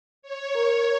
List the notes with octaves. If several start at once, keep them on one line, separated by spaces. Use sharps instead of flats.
C#5
A#4